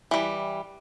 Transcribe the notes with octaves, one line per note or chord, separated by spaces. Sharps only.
E3 G3